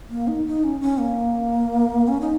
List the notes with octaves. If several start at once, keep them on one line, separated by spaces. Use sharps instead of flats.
A#3
D#4
D#4
C#4
C#4
A#3
C#4
D#4